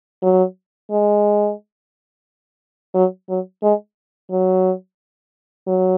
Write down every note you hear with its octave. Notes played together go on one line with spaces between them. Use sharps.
F#3
G#3
F#3
F#3
G#3
F#3
F#3